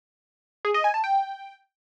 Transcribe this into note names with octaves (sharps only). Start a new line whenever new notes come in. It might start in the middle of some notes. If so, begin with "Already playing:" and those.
G#4
D#5
G#5
A5
G5